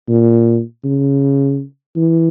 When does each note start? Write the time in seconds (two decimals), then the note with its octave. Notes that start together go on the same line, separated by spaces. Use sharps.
0.08 A#2
0.84 C#3
1.96 E3